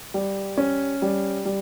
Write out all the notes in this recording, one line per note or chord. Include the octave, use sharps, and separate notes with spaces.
G3
C#4
G3
G3